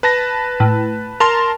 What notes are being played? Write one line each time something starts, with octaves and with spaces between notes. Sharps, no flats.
B4 A5 A#6
A2
A#4 A5 A#5 C6